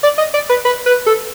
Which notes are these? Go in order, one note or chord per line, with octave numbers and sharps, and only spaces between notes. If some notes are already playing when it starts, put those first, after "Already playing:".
D5
D#5
D5
B4
B4
B4
A4